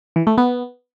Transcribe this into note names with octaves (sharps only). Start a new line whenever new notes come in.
E3
A3
B3